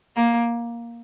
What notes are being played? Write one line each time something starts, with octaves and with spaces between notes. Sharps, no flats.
A#3